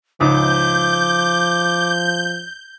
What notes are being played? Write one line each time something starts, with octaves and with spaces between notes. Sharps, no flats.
C#2 G#2 F3 D6 G6